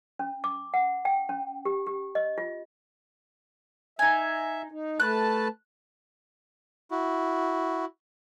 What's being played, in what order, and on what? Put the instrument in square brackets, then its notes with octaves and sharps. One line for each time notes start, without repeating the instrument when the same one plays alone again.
[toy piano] C#4
D6
F#5
G5
C#4
G4
G4
D#5
F4
[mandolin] D#4 G#5 [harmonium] E5
[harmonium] D#4
[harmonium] A3 B4 A5 [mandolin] F#6
[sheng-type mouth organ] E4 F#4